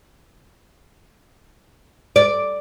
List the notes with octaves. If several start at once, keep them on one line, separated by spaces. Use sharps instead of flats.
D5